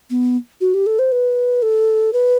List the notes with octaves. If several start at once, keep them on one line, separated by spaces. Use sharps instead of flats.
B3
F#4
G4
A4
C5
B4
A4
B4